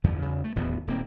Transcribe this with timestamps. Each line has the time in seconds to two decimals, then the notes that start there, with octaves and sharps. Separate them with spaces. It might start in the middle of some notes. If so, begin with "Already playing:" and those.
0.04 E2 G2 D3 F3
0.22 E2 C#3
0.44 A3
0.56 D1 A1 D#2 B3
0.87 D#1 A#3 C4